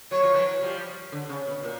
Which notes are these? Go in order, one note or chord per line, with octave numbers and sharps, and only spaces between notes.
F#3 C#5
F3
E3 F#3
F3 G3
D3
C#3
B2
A#2